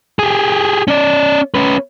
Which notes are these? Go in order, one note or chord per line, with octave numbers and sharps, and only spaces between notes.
G4 G#4
C#4 D5
C#4 B4